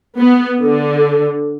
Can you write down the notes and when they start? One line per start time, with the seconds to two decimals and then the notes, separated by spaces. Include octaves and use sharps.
0.19 B3
0.64 D3